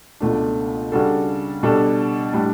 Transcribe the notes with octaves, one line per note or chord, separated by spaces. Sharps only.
C#2 B2 A3 D4
C#3 G3 D4 F#4 A4
B2 G3 D4 A4
A2 G3 D4